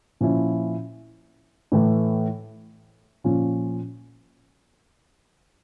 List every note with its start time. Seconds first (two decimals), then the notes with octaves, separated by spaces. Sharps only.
0.21 A#2 F3 C#4 E4
1.72 A2 E3 A3
3.24 A#2 F3 C#4 F4